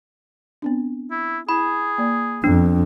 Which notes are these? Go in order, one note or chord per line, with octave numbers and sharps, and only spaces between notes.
B3 C4 D4
E4
E4 G#4 B5
A#3 D5
F2 B3 D4